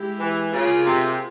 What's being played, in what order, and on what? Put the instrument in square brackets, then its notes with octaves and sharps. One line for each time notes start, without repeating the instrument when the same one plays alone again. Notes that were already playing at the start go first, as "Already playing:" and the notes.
Already playing: [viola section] G#3 E4 G4
[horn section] E3
[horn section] C#3 [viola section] A#3 F4 G#4
[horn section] C3